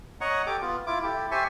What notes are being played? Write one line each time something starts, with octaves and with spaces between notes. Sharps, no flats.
C#5 D#5 F#5 A#5 C#6
G4 A4 D6
B3 F4
E4 F4 D6
E4 G4 A4
G4 C5 E5 G#5 A5 C#6